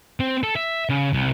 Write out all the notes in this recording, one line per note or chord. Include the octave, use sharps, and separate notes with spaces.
C4
A4
E5
C#3
C2